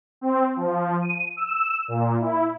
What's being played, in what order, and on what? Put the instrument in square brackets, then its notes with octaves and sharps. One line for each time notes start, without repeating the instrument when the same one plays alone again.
[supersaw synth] C4
F3
D#7
E6
A#2
E4